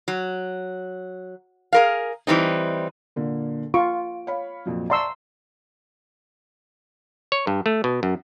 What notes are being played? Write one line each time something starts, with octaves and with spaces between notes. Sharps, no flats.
F#3
G#4 A#4 F5
E3 G3 C4 D#4
A#2 D3 A#3
F4 C#6 D7
C#5 F5 B5
F2 A#2 F#3
D5 A5 A#5 C6 C#6 E6
C#5
G2
A3
B2
F#2